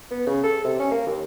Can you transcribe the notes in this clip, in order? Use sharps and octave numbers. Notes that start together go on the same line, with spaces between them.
B3
C#3
A4
C3
C#4
A#3
D#2